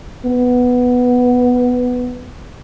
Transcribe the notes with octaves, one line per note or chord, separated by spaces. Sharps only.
B3